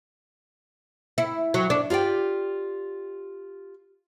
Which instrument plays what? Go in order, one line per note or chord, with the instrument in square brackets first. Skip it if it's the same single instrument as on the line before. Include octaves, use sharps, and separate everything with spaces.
[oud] E4
F#3
D4
[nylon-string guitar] F4 G4 D5 G5